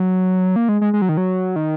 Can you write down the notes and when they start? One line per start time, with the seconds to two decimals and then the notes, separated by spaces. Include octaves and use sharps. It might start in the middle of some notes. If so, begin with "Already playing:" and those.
Already playing: F#3
0.56 A#3
0.69 G#3
0.81 G#3
0.93 G#3
1.02 F#3
1.09 D#3
1.17 F#3
1.56 D#3